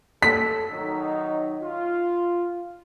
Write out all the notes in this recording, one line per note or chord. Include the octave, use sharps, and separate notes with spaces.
A4 B6
D#3 F#3 D#4
F4